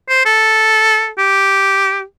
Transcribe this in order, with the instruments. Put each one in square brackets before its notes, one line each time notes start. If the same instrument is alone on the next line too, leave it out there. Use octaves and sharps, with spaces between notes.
[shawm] C5
A4
G4